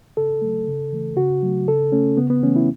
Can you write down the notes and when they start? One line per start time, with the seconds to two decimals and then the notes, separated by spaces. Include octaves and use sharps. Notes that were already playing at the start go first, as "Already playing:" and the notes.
0.17 C#3 A4
0.42 F#3 A3
0.67 C#3
0.92 E3 A3
1.17 C#3 F#4
1.43 F#3 A3
1.68 C#3 A4
1.92 A3 C#4
2.17 C#3 B3
2.30 B3
2.43 E3 A3 C#4
2.56 E4